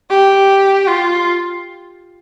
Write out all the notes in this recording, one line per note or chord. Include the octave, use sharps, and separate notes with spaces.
G4
F4